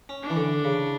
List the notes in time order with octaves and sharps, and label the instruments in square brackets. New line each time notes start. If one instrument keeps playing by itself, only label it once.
[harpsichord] C#4
[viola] D4
[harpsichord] E3
D3
C#3